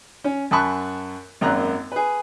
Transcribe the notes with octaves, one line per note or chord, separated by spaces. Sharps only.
C#4
F#2 G#5 A5 B5 C#6 F#6
G#1 F#2 A#3 A#5 F#6
G#4 B4